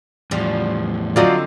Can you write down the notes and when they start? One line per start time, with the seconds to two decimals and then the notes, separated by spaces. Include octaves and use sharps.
0.31 E2 A2 F3 G3
1.16 D3 F#3 C4 F4 D5 D#5